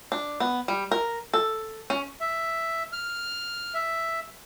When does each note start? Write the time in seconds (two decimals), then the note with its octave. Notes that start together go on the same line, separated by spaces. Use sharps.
0.12 D4
0.40 B3
0.68 G3
0.91 A#4
1.33 A4
1.90 C#4
2.20 E5
2.92 F6
3.74 E5